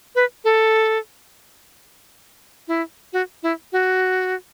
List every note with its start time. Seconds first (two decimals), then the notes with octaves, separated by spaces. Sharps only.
0.15 B4
0.45 A4
2.68 E4
3.13 F#4
3.43 E4
3.72 F#4